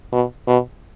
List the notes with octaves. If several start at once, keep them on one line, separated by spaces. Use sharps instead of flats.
B2
B2